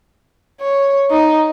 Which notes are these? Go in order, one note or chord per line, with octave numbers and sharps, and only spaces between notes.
C#5
D#4